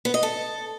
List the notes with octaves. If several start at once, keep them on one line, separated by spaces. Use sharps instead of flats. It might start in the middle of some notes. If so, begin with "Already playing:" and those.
B3
D#5
A4